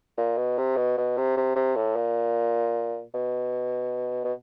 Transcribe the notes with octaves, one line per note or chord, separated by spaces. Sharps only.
A#2
B2
C3
B2
B2
C3
C3
C3
A2
A#2
B2
B2